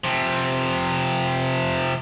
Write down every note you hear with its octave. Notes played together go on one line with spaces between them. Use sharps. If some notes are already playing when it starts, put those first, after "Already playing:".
C3 F3